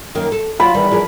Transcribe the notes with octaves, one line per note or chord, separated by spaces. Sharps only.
F#2 D#3 A#3
A4
F#3 F4 F#4 D5 B5
E2 D#3 E3 G3
F3 G#4 A#4